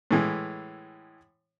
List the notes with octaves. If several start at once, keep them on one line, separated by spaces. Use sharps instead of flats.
A2 E3 G#3